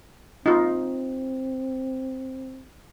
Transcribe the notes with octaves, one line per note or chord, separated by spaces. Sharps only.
C4 D#4 F4